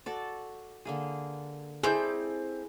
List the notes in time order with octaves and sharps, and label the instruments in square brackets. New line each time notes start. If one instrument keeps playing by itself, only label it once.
[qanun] F#4 A4 D5
D3 A#3 G#4
[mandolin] C4 G6 [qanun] E4 A4 D5 [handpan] G#4